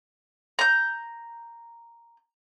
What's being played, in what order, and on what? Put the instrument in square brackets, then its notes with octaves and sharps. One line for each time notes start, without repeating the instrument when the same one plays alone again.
[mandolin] A#5 G6